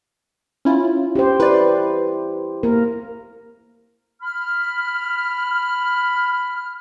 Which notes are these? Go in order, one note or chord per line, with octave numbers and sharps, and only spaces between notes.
C#4 E4 F4
G4 C5
E4 B4 D5
A#3 A#4
B5 F6